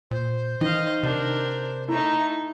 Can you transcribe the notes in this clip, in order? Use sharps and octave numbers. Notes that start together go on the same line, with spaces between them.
A#2 C5
D#3 E3 D#5 F5
C3 D4 A#4
A3 D#4 E4 A#5